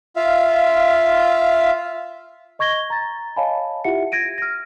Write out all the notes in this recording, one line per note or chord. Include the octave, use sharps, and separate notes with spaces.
F4 E5 F5
D#5 C#6 G#6 A#6 G7
A#5 A6
C#5 D#5 F5 G#5 A5 B5
E4 F4 G4 E5 F#5 C#7
G#6 A#6 D7 D#7
F6 A#6